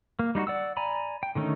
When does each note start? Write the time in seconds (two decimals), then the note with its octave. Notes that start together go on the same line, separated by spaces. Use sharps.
0.19 A#3
0.35 G3 D#4 F4 F#4
0.47 D5 F#5 E6
0.77 D5 G#5 A#5 B5
1.23 G5
1.35 D3 D#3 A3 C#4 D#4